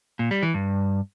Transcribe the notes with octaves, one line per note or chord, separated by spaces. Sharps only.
A#2
G3
E3
G2